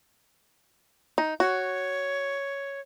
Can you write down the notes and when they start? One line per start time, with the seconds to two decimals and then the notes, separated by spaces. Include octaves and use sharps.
1.18 D#4
1.40 F#4 C#5